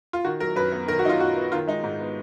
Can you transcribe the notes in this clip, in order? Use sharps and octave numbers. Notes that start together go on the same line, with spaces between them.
F4
D#3 F#4
F#3 A#4
F#2 B4
B3
D#3 A#4
F#4
F#3 D#4 F4
F#2 F#4
B3
D#3 F4
G#3 D#4
G#2
B3